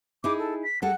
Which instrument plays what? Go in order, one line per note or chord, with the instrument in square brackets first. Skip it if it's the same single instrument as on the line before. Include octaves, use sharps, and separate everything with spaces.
[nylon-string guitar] D#4 E4 G#4 [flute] D6
[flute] A4
B6
[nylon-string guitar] G3 G#4 A4 [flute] F#5